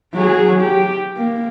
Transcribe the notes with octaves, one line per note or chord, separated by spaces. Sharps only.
F#3 G#4
G4
A#3